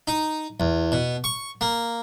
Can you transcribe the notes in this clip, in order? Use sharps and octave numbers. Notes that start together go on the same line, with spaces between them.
D#4
E2
B2
C#6
A#3